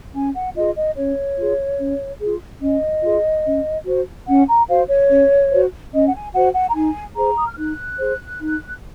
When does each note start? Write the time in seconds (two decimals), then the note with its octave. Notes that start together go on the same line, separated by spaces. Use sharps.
0.14 C#4 G#5
0.34 F#5
0.55 F4 G#4 D#5
0.76 D#5
0.96 C#4 C#5
1.38 F4 G#4
1.79 C#4
2.20 F4 G#4
2.61 C#4 D#5
3.03 F4 G#4
3.45 C#4
3.86 F#4 C5
4.27 C#4 F#5
4.48 A#5
4.68 F#4 C5 F5
4.88 C#5
5.09 C#4
5.50 F#4 C5
5.93 C#4 D#5
6.07 F#5
6.13 G#5
6.33 F#4 C5 F#5
6.54 F#5
6.70 A#5
6.74 D#4 G#5
7.16 G#4 C5 A#5
7.37 D#6
7.47 F6
7.57 D#4 F#6
7.99 G#4 C5
8.41 D#4